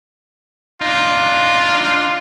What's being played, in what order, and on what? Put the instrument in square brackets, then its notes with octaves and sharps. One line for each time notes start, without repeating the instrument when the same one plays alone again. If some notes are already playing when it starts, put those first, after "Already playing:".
[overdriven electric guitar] D4 D#4 [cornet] F4